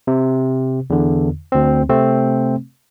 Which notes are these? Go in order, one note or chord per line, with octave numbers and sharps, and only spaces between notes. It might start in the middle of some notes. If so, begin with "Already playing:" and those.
C3
E2 D3
D2 C4
C3 A3 C4